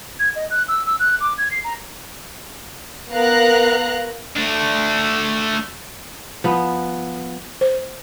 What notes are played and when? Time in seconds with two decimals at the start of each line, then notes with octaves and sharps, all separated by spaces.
0.20 G#6
0.36 D#5
0.50 F#6
0.68 E6
0.87 E6
1.00 F#6
1.21 D6
1.38 G#6
1.51 C7
1.64 A#5
3.11 B3 A#4 F5 A#5 F#6
4.37 A3 D4
6.44 F3 B3
7.61 C5